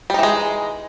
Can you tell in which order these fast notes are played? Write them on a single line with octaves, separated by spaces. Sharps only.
G3 D#4 E3 G#3